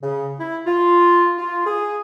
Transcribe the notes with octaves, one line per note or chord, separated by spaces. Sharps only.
C#3
E4
F4
F4
G#4